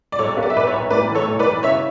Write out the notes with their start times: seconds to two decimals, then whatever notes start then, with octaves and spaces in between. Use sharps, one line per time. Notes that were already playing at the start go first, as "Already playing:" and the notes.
0.12 D5
0.19 B1 A4 C#5
0.37 B3
0.43 D5
0.50 E5
0.55 B1 B4 D5
0.67 C#5 E5
0.73 B1
0.91 A2 B4 D5
1.09 E3
1.15 A4 C#5
1.27 B1
1.39 B4 D5
1.46 E3
1.63 C#3 C#5 E5